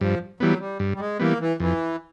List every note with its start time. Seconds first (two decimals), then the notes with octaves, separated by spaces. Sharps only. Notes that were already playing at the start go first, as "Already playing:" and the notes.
0.01 G2 F3
0.40 E3 F#3 G3 B3
0.60 G3
0.79 G2
0.94 G3
1.00 G#3
1.19 E3 G3 A#3 B3
1.40 E3
1.60 F2 E3